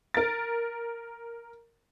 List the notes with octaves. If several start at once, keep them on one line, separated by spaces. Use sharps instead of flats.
A#4 A6